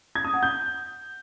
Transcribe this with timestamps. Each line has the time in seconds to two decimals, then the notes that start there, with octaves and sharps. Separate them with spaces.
0.15 G#6
0.24 D#6
0.34 F#5
0.43 G6